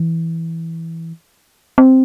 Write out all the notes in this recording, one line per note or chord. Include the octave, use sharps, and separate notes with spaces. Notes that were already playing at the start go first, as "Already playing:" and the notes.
Already playing: E3
C4